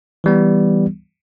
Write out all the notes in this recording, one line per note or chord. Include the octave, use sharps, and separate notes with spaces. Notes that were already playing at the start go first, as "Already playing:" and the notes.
E3 G3 B3